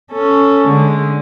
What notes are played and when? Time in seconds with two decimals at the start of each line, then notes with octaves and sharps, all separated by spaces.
0.12 C#4 A4
0.68 D3 G#3